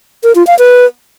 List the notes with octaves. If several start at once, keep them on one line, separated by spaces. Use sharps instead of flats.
A#4
F4
F5
B4